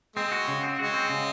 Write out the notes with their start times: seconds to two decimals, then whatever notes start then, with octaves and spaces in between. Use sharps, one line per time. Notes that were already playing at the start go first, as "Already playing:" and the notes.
0.16 G#3 C4
0.32 F#4
0.48 C#3
0.63 C4
0.79 G#3 F#4
0.94 C4
1.10 C#3